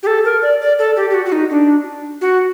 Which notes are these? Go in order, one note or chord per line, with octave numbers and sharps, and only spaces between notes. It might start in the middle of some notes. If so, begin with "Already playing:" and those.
G4
A4
A#4
D5
D5
A4
G4
G4
F#4
F#4
D#4
D4
F#4